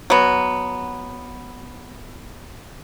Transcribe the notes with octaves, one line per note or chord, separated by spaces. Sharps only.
F#3 B3